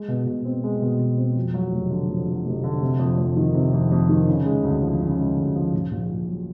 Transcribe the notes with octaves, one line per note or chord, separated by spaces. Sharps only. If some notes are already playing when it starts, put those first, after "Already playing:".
Already playing: G#3
B2
B2
C4
G#3
B2
B2
C4
F2
F#3
F1
D3
F2
F#3
F1
D3
C3
F2
F2
D#3
C3
F2
F2
D#3
C#3
G#3
D2
F3
C#3
G#3
D2
F3
A#2
A#1
A#1
F#3